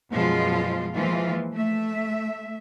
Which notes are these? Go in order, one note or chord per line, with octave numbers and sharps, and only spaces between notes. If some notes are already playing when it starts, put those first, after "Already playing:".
F#2 B2 F3 G#3 F4
E3 F3 G#3 A#3 F4
A3 E5